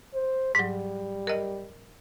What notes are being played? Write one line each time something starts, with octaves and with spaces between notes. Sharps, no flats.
C5
G#2 F#3 G3
A#4 D#5